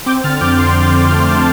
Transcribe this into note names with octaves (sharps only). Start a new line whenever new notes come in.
C4 D6 G6
D3 F6 A6
F2 D6 G6
D3 C6 F6
C4
D3
A3 C6 F6
C4 A5 D6